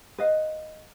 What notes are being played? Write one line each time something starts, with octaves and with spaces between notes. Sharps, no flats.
B4 D#5 F5